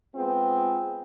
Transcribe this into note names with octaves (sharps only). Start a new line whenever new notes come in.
G#3 B3 C4 F4 G#4